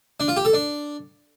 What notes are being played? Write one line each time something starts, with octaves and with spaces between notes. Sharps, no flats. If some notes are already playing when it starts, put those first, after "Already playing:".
D4
F4
G4
A4
D4